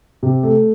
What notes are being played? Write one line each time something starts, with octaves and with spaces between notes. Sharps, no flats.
C3
A3